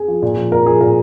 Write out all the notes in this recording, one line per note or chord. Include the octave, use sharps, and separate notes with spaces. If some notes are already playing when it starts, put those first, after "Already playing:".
Already playing: G#4
F3
A#2
F3
A#2 A#4
F3 G#4
A#2 A#4